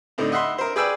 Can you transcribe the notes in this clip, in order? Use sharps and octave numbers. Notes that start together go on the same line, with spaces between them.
A2 D3 C4 D#4
D#5 E5 F#5 B5 C6
A#4 C5
G#4 B4 D5 G5 G#5 E6